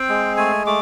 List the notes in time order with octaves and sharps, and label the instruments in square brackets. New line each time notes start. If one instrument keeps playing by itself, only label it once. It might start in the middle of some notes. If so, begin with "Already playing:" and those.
Already playing: [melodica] C4 G5
G#3
A3 G#5
A3 D6